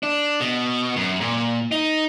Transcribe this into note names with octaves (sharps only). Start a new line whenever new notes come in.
D4
B2
F#2
A#2
D#4